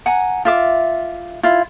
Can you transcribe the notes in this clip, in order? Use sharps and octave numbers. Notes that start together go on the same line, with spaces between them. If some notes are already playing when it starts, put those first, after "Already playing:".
F#5 G#5 A#5
F4 E5 D6
E4 F4